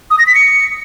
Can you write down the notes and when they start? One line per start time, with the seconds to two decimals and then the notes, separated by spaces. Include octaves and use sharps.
0.11 D#6
0.19 A#6
0.27 B6
0.35 C#7